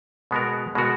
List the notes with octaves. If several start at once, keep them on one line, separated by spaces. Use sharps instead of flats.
B2 G#3 B3 F#4 A#4
B2 G#3 B3 F#4 A#4